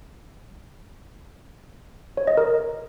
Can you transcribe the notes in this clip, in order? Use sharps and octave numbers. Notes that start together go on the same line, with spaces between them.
C#5
D#5
A#4